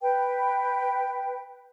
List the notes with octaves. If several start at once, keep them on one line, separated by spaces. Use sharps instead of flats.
B4 G5